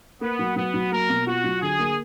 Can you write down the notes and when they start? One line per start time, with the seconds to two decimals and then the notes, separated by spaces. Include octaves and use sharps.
0.21 A#3 B3
0.39 F#3
0.56 F#3 B3
0.74 F#3
0.92 A#3 A#4
1.09 B2
1.26 F4 F#4
1.44 F#3
1.62 D3 G#4
1.79 A#3